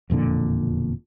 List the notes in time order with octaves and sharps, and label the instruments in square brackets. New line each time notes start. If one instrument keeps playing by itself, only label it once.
[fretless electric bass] E1 F2 A#2 D3